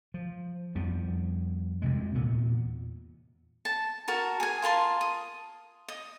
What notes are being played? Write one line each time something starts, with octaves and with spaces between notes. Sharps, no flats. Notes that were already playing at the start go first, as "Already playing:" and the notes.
F3
F2 F3 G3 B3
D2 C3 G#3
E2 A#2 B3
A5
F#4 A#4 A5
G#4 G#5
F4 A#4 A5 C6
D#6
D#5